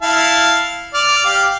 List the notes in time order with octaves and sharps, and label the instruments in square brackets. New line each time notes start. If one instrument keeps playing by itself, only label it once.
[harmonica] E4 F5 A5
D5 F6
G4 F5